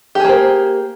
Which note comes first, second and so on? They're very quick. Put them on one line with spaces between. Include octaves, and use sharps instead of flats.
G4 G#4 A#3 C5